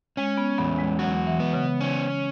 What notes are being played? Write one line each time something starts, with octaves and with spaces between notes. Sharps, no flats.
G#3 C#4
B3
E2 B3
G#3
F#3 F#4
E3
B3
C#3
C#4